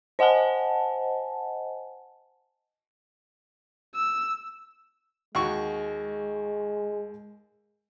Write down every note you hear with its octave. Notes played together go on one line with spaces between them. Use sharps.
C5 D#5 F#5 G#5 A5
E6
D#2 G#3 F#4 C#6